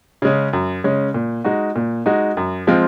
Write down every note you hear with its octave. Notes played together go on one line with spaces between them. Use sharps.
C#3 G#3 C#4
F#2
C#3 G#3 C#4
A#2
G#3 D#4 F#4
A#2
G#3 D#4 F#4
F#2
F3 G#3 C4 F4